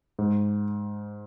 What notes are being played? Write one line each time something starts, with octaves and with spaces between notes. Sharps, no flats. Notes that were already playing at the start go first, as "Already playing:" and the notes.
G#2